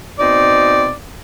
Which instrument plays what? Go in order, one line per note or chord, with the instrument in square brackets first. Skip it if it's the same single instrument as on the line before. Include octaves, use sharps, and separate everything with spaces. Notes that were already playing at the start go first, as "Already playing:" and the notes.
[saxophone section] B2 C4 D#4 D5